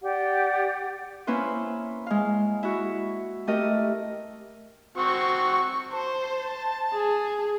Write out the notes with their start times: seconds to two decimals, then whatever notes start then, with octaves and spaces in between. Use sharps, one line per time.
0.01 G4 D5 F#5
1.27 A#3 C#4 E4 B4 C5
2.06 G#3 F5
2.63 E4 F#4
3.47 A3 G4 A#4 D#5
4.98 C4 F#4 C#6
5.93 C5 A5
6.93 G#4